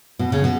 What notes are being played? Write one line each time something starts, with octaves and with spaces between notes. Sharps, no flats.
B2
C#3
B2